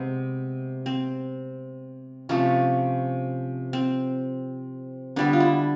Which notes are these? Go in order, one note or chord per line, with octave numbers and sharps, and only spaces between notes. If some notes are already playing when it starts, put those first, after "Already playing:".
Already playing: C3 G#3 B3
C4
C3 F3 A3 C#4
C4
D3 G3 B3 D4
F4
E4